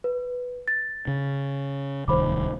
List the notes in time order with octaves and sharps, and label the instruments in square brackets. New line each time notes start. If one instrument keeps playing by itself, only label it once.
[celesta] B4
A6
[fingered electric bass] C#3
[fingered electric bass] D1 C2 D#3 [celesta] C5 B5 D6